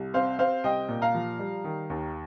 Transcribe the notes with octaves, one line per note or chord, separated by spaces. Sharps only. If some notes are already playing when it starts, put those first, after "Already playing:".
Already playing: C2
C4 C5 F5
C4 C5 F5
C2 D#5 G5
A#2
F5 A#5
F3
G3
D#3
D#2